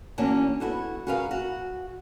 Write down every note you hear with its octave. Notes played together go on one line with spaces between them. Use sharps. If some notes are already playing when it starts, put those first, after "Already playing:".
E3 A#3 C#4 D4 F#4 A#4
B3 E4 F#4 A4
F#4 G#4 A#4 B4 F5
F#4